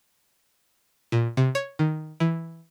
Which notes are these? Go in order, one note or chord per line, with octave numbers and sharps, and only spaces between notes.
A#2
C3
C#5
D#3
E3